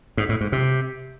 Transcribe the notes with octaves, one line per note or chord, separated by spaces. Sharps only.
G#2
A2
G#2
C3